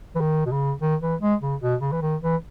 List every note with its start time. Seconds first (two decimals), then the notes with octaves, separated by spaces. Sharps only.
0.15 E3
0.21 D#3
0.46 B2
0.51 C#3
0.81 D#3
1.01 E3
1.21 G#3
1.41 C#3
1.61 B2
1.81 C#3
1.92 E3
2.02 D#3
2.22 E3